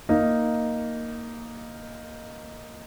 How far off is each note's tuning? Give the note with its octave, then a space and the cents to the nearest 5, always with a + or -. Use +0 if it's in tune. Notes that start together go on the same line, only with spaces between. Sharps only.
A#3 +0 D#4 +0